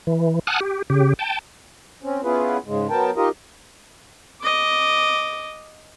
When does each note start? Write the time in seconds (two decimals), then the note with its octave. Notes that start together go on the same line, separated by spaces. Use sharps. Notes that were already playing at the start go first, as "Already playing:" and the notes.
0.07 E3
0.47 F#5 G#5 A5 D#6 F6 F#6
0.60 G4
0.90 C#3 G4
1.19 G5 A5
2.02 C4 C#4
2.24 B3 C#4 E4 F4 G#4 B4
2.66 G#2 C#3 G#3
2.90 F#3 B3 A#4 G5 A5
3.16 D#4 F4 G4 A#4 D#5
4.42 D#5 D6